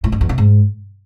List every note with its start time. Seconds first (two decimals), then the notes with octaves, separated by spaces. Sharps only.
0.04 A2
0.12 G2
0.21 E2
0.29 C3
0.38 G#2